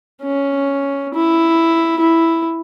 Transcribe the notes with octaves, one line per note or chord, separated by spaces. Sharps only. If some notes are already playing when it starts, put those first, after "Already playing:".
C#4
E4
E4